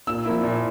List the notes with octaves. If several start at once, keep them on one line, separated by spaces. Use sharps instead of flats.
A#2 E6
F3 A#3 E4
A#2